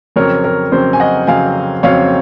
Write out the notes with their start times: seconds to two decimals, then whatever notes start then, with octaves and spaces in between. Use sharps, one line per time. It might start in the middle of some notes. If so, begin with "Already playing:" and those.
0.16 F2 C#3 F#3 C4 A#4 C#5
0.44 A#4
0.71 F2 C#3 F#3 C4 C5
0.93 G#5
1.00 D#5 F#5
1.27 F2 C#3 F#3 C4 F5 G#5
1.83 F2 C#3 F#3 C4 C#5 F5